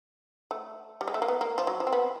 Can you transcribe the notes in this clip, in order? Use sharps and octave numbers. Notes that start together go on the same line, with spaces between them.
A3
G3
G#3
A3
A#3
B3
A#3
F3
F#3
F3
C4
B3